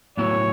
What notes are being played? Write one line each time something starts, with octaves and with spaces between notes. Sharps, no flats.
A2 F#3 B3 E4 C#5